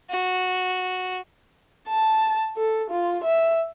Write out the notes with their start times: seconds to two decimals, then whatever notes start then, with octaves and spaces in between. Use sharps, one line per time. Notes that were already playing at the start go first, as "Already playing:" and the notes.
0.10 F#4
1.89 A5
2.57 A4
2.91 F4
3.24 E5